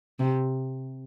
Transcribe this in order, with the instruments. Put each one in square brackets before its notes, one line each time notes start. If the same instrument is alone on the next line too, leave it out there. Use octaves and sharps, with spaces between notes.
[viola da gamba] C3